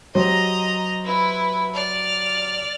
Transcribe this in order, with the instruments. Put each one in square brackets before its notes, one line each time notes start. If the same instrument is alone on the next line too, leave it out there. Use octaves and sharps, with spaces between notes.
[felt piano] F#3 G4 C5 [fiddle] D#5 A#5
[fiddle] E4 B4
D5 F6